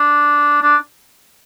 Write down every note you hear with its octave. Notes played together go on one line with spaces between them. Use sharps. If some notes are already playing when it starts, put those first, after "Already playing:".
Already playing: D4
D4